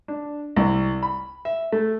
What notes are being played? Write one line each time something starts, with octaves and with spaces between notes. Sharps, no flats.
D4
C2
B5
E5
A3